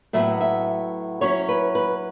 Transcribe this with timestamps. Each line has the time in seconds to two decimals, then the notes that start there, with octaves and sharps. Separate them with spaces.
0.13 A2 F#3 B3 E5
0.40 E5
1.21 F#3 C#4 E4 C#5
1.49 B4
1.75 B4